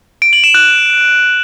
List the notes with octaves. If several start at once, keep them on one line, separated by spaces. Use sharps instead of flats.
D7
F#7
E7
F#6